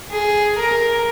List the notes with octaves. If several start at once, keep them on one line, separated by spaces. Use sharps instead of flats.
G#4
A#4